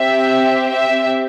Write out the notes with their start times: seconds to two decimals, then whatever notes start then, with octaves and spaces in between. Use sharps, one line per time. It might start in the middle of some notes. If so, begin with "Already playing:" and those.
Already playing: C4 G4 E5
0.71 E5